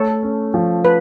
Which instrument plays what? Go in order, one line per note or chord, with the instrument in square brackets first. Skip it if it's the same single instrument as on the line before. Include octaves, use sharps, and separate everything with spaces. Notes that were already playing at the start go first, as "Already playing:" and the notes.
Already playing: [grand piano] A3 [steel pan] A4 C#5
[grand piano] C#4
F3
[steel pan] B4